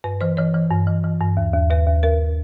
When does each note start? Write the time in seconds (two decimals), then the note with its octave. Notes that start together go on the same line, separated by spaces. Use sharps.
0.04 G2 B4
0.21 E3 C5
0.37 E3 C#5
0.54 E3
0.71 G2
0.87 E3
1.04 E3
1.20 G2
1.37 D#2
1.53 D#2
1.71 D#2 B4
1.86 D#2
2.03 D#2 A#4